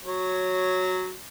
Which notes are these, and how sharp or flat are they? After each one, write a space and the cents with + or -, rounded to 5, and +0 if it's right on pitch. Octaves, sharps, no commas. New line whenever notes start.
F#3 -5 C#5 +0